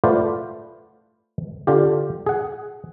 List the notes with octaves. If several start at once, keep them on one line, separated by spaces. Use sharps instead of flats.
A3 F4 B4 C5 D5 F#5
D3 F4 G4
G#4 F#5